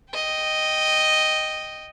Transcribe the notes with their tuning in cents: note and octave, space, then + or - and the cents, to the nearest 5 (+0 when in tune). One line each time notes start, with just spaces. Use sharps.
D#5 +0 G5 +0